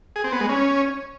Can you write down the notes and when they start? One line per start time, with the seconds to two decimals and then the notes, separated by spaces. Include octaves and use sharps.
0.16 G#4
0.24 C4
0.32 B3
0.41 G#3
0.49 C#4